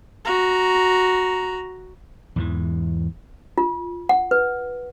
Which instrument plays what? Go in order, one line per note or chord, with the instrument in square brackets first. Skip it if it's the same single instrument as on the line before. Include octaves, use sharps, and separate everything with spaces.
[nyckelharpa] F#4 A#5
[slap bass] E2 G#2 E3
[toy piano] F4
F#5
B4